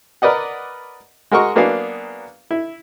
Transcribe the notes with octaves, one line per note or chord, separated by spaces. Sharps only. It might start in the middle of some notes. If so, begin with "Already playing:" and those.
A#4 B4 D5 D#5 F#5
G#3 F#4 A#4 D#5 C#6
F#3 A#3 B3 D4 G#4 F5
E4